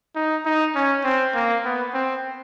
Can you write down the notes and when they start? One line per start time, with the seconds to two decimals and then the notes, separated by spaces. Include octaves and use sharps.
0.16 D#4
0.46 D#4
0.75 C#4
1.04 C4
1.35 A#3
1.65 B3
1.94 C4